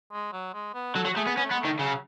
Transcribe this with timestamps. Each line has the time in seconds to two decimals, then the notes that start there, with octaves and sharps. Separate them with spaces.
0.12 G#3
0.33 F#3
0.54 G#3
0.74 B3
0.95 F#3 A4
1.05 F#3
1.10 F#4
1.16 A3 G#4
1.27 B3
1.37 B3 C#4
1.44 A3
1.51 G#3 B3
1.59 A3
1.65 D#3
1.79 C#3 F#3